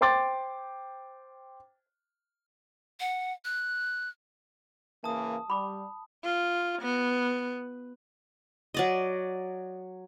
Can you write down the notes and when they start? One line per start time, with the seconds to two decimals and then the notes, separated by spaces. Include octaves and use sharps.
0.01 C5 G5 C6 D6 A6
3.00 F#5
3.45 F#6
5.04 C#3 E3 A#3 A5 D#6
5.50 G3 B5 D6
6.24 F4
6.82 B3
8.74 F#3 D5 D#5